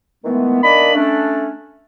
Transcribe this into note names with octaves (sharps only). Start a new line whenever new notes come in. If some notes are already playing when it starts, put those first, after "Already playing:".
D#3 E3 G#3 A3 B3
D#3 A#3 D4 D5 D#5 B5
A3 C#4 D4